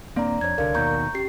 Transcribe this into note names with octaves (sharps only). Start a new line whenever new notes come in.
D#1 A#3 C4 D4 D5 A#5
F2 C#5 G#6
C2 D3 A#4 D5 F5
D#2 B2 D#3 A#5 C#6 G6
C#4 G4 C7